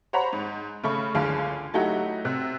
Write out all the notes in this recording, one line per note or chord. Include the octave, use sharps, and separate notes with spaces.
C5 C#5 F#5 A#5 B5
G#2
C#3 A3 B5 C#6
F#1 C#2 D3 G#4 F5 A5
F#3 A3 D#4 E4 F#4 G4
C3 F#6